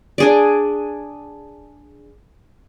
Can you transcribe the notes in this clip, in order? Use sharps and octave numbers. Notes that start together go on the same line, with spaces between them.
D4 G#4 D5